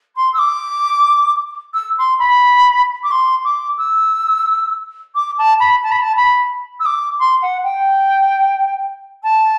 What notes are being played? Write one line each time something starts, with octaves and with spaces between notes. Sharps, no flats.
C6
E6
D6
E6
C6
B5
D6
C6
D6
E6
D6
A5
B5
A5
B5
A5
B5
E6
D6
C6
F#5
G5
A5